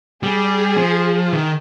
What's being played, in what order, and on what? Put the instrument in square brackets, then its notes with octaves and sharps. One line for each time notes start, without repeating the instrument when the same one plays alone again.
[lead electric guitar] G3 [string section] G#4
[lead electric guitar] F3
D#3